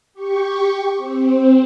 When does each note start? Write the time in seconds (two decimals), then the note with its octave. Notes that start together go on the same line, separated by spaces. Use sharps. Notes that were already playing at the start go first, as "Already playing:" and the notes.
0.14 G4 C#6
0.97 C4